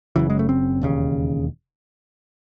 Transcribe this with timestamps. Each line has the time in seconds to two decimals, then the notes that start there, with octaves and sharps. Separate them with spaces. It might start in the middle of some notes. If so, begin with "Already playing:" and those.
0.16 F#1 F#2 C#3 E3
0.30 G#3
0.39 A3
0.49 C4
0.82 E1 D#2 C#3